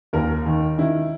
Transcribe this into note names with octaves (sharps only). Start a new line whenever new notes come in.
D#2 A#4
D#3
D#3 E4